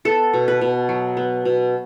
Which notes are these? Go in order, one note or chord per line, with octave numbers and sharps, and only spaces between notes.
B3 A4
B2
B4
B2
F#3
B3
B2